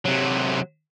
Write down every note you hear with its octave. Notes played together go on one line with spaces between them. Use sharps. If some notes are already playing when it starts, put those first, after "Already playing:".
C3 F#3